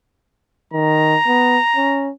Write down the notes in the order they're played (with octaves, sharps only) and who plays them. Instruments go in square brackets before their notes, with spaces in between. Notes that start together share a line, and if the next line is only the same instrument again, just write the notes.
[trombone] D#3 [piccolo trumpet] A#5
[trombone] B3
C#4